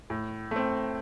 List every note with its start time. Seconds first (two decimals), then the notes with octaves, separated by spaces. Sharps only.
0.10 A2
0.51 A3 C4